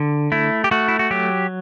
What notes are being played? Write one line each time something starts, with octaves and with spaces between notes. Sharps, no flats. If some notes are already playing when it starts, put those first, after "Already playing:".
Already playing: D3
A3 E4
G4
A3 F#4
E4
F#4
F#3 G4